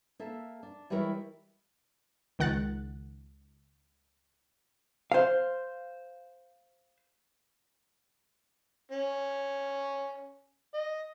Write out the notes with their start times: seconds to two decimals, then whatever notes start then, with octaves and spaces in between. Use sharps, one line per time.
0.19 A#3 A4 E5
0.63 D4
0.90 E3 G3 G#3 E4 A#4 C#5
2.39 C#2 D#3 F#5 F#6 A6
5.12 C5 F5
8.92 C#4
10.74 D#5